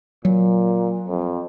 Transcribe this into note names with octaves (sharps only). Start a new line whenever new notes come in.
A#2 F#3
F2